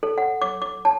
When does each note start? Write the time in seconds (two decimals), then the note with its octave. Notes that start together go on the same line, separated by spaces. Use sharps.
0.03 A4
0.18 F#5
0.42 D6
0.62 D6
0.85 A5